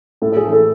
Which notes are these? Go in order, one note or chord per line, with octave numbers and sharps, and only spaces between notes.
A2 A4
A4
G#4
E3 A3
A4